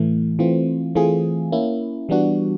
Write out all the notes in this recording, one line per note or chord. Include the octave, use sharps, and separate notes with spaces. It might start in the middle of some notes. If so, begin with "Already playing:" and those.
Already playing: A2 E3 A3
E3 A3 C4 F4
E3 A3 C4 F4 G#4
A#3 C#4 E4
E3 G3 B3 D4 F#4